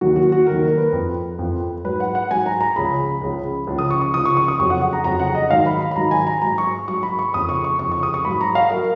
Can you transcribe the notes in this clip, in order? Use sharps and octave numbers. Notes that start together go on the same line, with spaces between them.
D#2 D#3 F#3 F#4
F#4
F#4
D#2 D#3 F#3 A#4
A#4
B4
F2 F3
F2 F3
G#2 F#3 B4
F#5
F#5
G#2 F#3 G#5
A#5
A#5
C#2 C#3 F3 B5
C#2 C#3 F3
C#2 C#3 F3
D#6
C#6
C#6
C#2 C#3 F3 D#6
C#6
C#6
D#6
F2 C#3 F#3 C#6
F#5
F#5
A#5
F2 C#3 F#3 A#5
F#5
D#5
G#2 D#3 F#3 F5
B5
B5
B5
G#2 D#3 F#3 A#5
G#5
A#5
G#2 F#3 A#5
C#6
G#2 F#3 C#6
B5
C#6
F2 C#3 F3 D#6
C#6
C#6
F2 C#3 F3 C#6
C#6
D#6
C#6
G#2 F#3 B5
A#5
F5
F#3 A#4